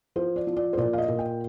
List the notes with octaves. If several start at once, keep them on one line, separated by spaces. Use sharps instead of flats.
F3 C5
D5
F3
D5
C5
A#2 D5
F5
D#5
A#2
G5